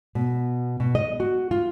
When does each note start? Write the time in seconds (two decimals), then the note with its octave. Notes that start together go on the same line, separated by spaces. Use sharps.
0.15 B2
0.80 B2
0.95 D#5
1.20 F#4
1.51 F4